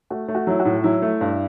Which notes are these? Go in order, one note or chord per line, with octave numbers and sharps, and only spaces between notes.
A3 F#4
A3
F#4
F#3 E4
F#4
A2
F#3 E4
A3
G2